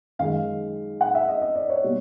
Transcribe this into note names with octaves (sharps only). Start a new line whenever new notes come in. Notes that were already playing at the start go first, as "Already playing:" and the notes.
F#2 D#3 G#3 F5
F#5
E5
D#5
D#5
D5
C#5
B2 G3 A#3